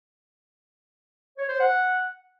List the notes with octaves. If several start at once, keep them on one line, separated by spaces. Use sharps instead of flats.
C#5
C5
F#5